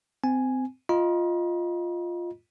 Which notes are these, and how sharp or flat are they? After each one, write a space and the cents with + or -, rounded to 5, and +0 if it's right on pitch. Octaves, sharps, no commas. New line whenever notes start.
C4 -25 G#5 +0
F4 +0 D#5 +0 A#5 +45